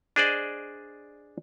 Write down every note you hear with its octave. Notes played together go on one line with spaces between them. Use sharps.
D4 G#4 C5 D5 D#5